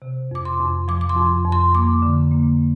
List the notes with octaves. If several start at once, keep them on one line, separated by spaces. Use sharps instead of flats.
C3
F2 D6
C6
F2
F3 D6
D6
C6
F2
F2
C6
A#3 D6
D3
A#3